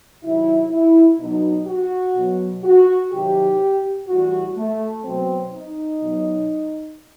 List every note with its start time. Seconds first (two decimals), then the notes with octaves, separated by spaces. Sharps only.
0.23 C3 D#3 F#3 E4
0.71 E4
1.19 B2 F#3 D#4
1.67 F#4
2.15 B2 F#3
2.64 F#4
3.11 C3 D#3 F#3 G4
4.08 A2 E3 G3 F#4
4.57 A3
5.04 B2 F#3 C4
5.52 D#4
6.00 B2 F#3